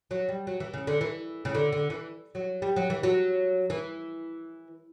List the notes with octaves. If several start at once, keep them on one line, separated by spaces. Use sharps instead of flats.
F#3
G3
F#3
E3
C#3
D3
E3
C#3
D3
D3
E3
F#3
G3
F#3
E3
F#3
E3